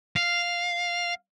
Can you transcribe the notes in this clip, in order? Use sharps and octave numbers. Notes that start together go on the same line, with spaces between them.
F5